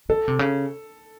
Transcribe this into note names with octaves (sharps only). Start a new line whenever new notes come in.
D3 A4
C3
C#3